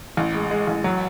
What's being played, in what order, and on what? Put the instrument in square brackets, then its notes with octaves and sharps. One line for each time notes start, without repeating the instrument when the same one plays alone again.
[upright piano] A1
G#3
G#3
A1
F#3